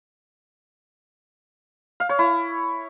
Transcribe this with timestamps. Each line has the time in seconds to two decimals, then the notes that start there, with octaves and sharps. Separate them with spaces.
2.00 F5
2.09 C#5
2.19 E4